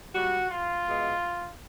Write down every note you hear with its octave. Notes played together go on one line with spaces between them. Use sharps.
A#2 G3 F#4
F4
B2 G#3